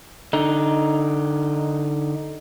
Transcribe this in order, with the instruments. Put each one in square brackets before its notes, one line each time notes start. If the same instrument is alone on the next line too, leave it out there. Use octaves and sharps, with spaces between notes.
[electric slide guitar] D3 D#4